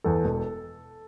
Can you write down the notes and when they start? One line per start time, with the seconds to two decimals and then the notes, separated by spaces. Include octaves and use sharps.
0.04 E2 A4
0.24 E1